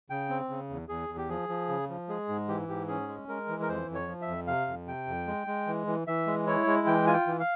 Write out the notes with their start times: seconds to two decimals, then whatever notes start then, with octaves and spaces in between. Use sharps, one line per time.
0.10 C#3 G5
0.29 C4
0.49 C#3
0.70 E2
0.89 E2 G#4
1.09 E2
1.18 G4
1.29 F3 G#4
1.49 F3
1.69 C#3
1.89 F3
2.08 G#3 G#4
2.29 G#2
2.48 E3 G4
2.68 G#2 G4
2.88 C#4 G#4
3.08 G#3
3.28 G#3 A#4
3.48 E3
3.62 A#4
3.68 F2 C5
3.88 F2
3.95 C#5
4.08 F3
4.22 E5
4.27 F2
4.47 C3 F5
4.67 F2
4.87 C3 G5
5.07 F2
5.27 G#3
5.47 G#3
5.67 E3
5.87 E3
6.07 E3 E5
6.27 G#3
6.47 E4 C#5
6.67 G#3
6.87 E3 G5
7.07 F4 G#5
7.13 G5
7.27 E3
7.40 F5